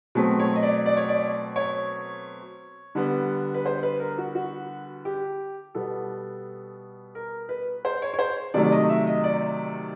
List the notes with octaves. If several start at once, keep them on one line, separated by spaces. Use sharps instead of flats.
B2 F#3 A3 C4
C#5
D#5
D5
D5
C#5
D5
C#5
D3 G3 B3
B4
C5
B4
A#4
F#4
F#4
G4
B2 G3 B3 A4
A#4
B4
C5
C#5
C#5
C5
C3 D#3 F#3 A3 D5
D5
D#5
E5
D#5
D5